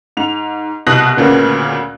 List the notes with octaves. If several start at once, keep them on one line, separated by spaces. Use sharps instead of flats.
G#2 F7
C2 B2 D#6 F#6 A#6 F#7
D2 A#2 C#3 B3